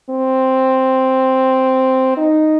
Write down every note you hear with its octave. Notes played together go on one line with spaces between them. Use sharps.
C4
D#4